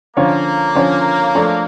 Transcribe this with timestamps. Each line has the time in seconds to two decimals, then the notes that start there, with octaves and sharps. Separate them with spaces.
0.16 D3 F3 A#3 C#4 F4 C#5
0.75 D3 F3 C#4 F4 C#5
1.35 F3 A3 D4 A4 C#5